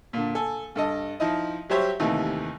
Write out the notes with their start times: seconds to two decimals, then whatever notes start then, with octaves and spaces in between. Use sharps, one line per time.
0.13 A#2 D3
0.35 A4 G#5
0.75 G2 A4 D#5
1.20 F3 D#4 E4 D#5
1.69 F#3 G3 G4 C5 C#5 E5
2.00 D#2 C3 E3 A3 D#4